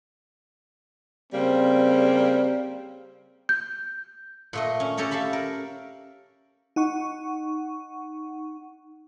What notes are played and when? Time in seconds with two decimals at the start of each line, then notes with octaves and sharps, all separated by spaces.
1.32 C#3 G3 A#3 C4
3.49 G6
4.53 A#2 A3 D#5
4.80 C#4
4.97 C#4 G4 A4 C#5 A#5
5.11 A4 E5 F5 B5
5.33 A#4
6.76 D#4 F#5 C#6